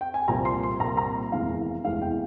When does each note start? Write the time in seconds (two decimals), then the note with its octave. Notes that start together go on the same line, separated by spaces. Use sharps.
0.01 G5
0.14 G#5
0.28 C2 A#2 F3 A#3 A#5
0.45 C6
0.63 C6
0.79 C2 A#2 F3 A#3 A#5
0.97 A#5
1.32 F1 E2 E3 G#3 F5
1.84 F1 E2 E3 G#3 F5
2.02 G5